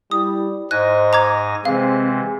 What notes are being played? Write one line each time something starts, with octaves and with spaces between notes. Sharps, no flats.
G3 E4 D#6
G#2 C5 D#5 G#5 F#6 A#6
A#5 D6 G#6
C3 E3 G#3 C4 F5